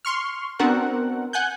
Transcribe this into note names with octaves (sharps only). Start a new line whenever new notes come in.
C6 C#6 F6
B3 C4 D4 F#4 A#4 F#5
F#5 G#5 F#6 G6